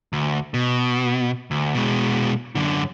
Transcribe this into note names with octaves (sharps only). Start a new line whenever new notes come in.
D2
B2
D2
B2 G#3
F#2 D3